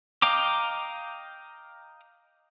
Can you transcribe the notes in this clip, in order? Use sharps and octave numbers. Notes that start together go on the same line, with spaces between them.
D#5 F5 G5 A#5 D6